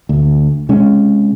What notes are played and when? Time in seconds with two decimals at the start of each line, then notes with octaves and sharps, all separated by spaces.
0.09 D2
0.69 C3 G#3 C#4